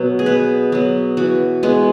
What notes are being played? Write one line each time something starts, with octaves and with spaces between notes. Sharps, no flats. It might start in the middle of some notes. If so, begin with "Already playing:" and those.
Already playing: B2 F#3 B3
G#4
B2 B4
F#3 B3
E3 F#4
G#3 B3